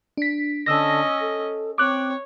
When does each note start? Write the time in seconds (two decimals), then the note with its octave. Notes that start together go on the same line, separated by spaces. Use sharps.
0.17 D4 B6
0.66 D3 C#4 D#5 E6 A#6
1.21 A4
1.78 C4 C#5 D6 F#6